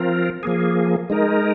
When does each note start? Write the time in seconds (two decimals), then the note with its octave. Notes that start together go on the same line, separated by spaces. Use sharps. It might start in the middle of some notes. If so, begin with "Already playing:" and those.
Already playing: F3 C4 F4 A#4
0.43 F3 A#3 G#4
1.10 G#3 D#4 A#4